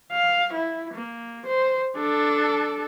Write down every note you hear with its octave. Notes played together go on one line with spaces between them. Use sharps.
F5
E4
A#3
C5
D4 A4